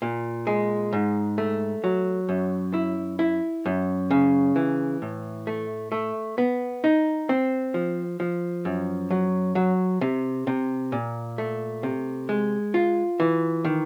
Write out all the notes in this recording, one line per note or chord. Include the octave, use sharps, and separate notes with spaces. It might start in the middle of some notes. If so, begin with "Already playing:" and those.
A#2
G#3
G#2
A3
F#3
F#2
E4
E4
F#2
C#3
E3
A2
A3
A3
B3
D#4
C4
F3
F3
F#2
F#3
F#3
C3
C3
A#2
A3
C3
G#3
F4
E3
D#3